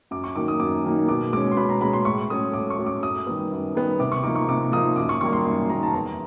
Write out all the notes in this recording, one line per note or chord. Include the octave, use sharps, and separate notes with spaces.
F#2 D6
C#6
D#3 F#3 A#3 D#4 D6
D#6
F#2 D6
D#3 F#3 A#3 D#4
B2 D6
G#3 C#4 D6
C6
B2 B5
A#5
G#3 C#4 B5
C6
A2 C#6
F#3 A3 C#4 D#6
A2 D6
C#6
F#3 A3 C#4
D6
F#2 D#6
D#3 G3 B3 D#6
F#2
D#3 G3 B3
C3 D6
C#6
F3 A#3 D#4 D6
C#6
C3 D6
F3 A#3 D#4 D#6
F#2 D6
C#6
D#3 G3 A#3 C#6
C6
F#2 C6
D#3 G3 A#3 A#5
A5
E2 A#5